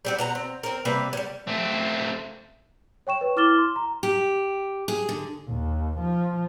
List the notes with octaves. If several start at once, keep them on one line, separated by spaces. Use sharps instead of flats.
G3 C4 F#4
B2 F#5 A#5
C4
C4 A#4
C3 G3 A#3 B4
F#3 G3
A3 C4
C#5 G5 C#6 E7
B4 C#5
E4 D6 F6 A6 E7 G7
C6
A#5
G4
G#4
D3
D#2
F3